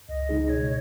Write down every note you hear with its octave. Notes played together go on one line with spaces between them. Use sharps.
C#2 D#5
C#3 G#3 D#4 G#4
B2 C#5